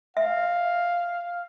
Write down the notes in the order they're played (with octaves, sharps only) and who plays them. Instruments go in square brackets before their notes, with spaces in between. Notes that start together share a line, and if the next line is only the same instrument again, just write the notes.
[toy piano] E5 [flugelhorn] F5